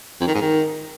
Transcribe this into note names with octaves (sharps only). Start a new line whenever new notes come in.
F2
D#3
G#2
D#3